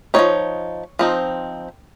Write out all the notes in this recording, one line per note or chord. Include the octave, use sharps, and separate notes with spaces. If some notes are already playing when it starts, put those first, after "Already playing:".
F3 C4 D#4 C#5
F3 C4 D#4